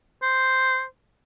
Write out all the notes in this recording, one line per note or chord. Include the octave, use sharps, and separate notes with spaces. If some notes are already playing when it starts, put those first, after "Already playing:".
C5